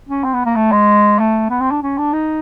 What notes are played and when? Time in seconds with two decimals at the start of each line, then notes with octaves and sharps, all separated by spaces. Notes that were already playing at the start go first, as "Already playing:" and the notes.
0.09 C#4
0.24 C4
0.34 B3
0.45 A#3
0.56 A3
0.72 G#3
1.19 A3
1.50 B3
1.61 C4
1.71 D4
1.83 C#4
1.98 D4
2.13 D#4